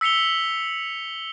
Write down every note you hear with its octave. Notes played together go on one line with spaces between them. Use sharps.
E6 B6 C#7 F7 G7